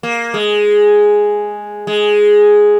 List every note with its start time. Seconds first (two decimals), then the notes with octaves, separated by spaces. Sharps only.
0.03 A#3
0.34 G#3
1.87 G#3